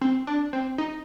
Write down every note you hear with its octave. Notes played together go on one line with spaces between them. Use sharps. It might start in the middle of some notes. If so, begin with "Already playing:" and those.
C4
D4
C4
D#4